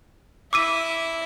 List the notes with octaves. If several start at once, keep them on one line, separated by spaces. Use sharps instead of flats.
E4 E5 D6 E6 D#7